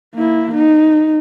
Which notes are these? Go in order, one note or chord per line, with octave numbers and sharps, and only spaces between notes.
A#3 E4
D#4